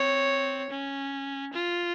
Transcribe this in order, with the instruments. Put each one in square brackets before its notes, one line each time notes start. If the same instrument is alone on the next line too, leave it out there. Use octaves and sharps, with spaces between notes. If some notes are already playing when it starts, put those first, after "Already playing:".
Already playing: [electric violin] C4 [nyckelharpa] C#5
[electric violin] C#4
F4